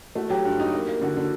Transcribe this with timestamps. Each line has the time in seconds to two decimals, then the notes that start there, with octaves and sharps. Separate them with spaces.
0.15 A3 F#4
0.30 F#3 G4
0.45 G2
0.60 D#4
0.74 A#3
0.88 A#3
1.01 D3 F#4
1.17 D3